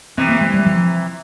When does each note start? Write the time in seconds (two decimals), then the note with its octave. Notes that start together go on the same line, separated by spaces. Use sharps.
0.17 C3 E3 C4
0.29 A#3
0.41 G#3
0.54 G3
0.66 F3